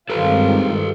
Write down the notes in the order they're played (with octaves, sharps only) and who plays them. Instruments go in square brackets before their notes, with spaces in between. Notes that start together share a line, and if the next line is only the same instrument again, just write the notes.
[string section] G2 D#3 G#3 C4 F4 [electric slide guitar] A4 B4